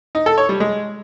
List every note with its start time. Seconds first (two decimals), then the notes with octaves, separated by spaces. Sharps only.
0.15 D#4
0.26 A4
0.38 C#5
0.49 G3
0.60 G#3